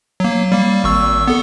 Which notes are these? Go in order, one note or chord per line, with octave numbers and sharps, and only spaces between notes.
F#3 A#3
G3 A#3
G#1 C#6 E6
B3 A4